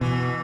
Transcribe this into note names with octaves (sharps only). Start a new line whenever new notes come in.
B2 E3